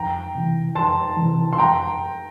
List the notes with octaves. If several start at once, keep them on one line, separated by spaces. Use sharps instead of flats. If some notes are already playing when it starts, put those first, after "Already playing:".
Already playing: F2 G5 A#5
C3 E3
F2 A5 C6
C3 E3
C6
F2 G5 A#5